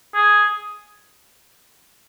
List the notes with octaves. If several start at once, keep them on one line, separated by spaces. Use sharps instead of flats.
G#4